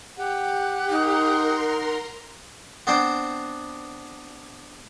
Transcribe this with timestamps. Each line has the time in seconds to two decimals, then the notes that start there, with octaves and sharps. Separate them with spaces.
0.17 G4 F#5
0.90 D#4 A#4 A#5 C6
2.87 B3 C4 D4 C5 G5